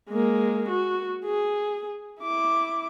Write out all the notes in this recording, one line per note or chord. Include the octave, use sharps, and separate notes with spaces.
G#3 A#3
F#4
G#4
E4 D6